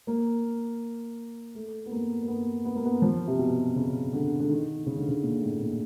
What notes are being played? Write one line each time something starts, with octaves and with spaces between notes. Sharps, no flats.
A#3
A3
B3
A#3
A#3
B3
B3
A#3
B3
F3
C3
B2
C#3
D3
D3
D#3
C#3
D3
C#3
A#2
A2
A#2